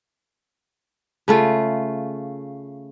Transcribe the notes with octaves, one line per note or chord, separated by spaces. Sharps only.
C#3 A3 F4